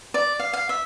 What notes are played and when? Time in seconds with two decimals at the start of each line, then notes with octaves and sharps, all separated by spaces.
0.14 D5
0.40 F5
0.53 F5
0.69 E5